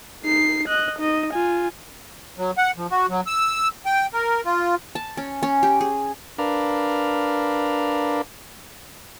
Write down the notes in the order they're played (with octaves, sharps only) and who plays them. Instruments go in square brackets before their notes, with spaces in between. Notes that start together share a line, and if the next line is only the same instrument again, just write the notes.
[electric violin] D#4 C7
D#5 F#6
D#4 D#5
F4 G#5
[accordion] F#3
F#5
F3
F#4
F#3
E6
G5
A#4
F4
[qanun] A5
C#4
C#4
G4
G#4
[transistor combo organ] D4 A#4 B4 F5